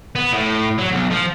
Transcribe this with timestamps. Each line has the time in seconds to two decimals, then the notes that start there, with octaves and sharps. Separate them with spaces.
0.16 B3
0.33 A2
0.78 F#3
0.91 B1
1.10 F3